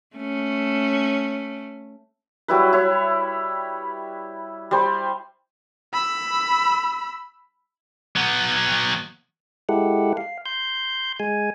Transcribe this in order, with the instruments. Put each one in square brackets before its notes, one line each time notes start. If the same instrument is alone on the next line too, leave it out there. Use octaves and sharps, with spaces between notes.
[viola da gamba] A3 C#4
[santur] F#3 G3 E4 B4
E4 C#5
G3 C5 B5
[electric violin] B5 E6
[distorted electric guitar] F#3 B3
[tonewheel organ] G#3 E4 G4 A4 F#5
F5
C6 G6
G#3 G#5